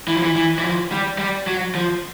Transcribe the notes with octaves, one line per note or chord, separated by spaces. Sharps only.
E3
F3
E3
E3
E3
F3
G3
G3
F#3
F3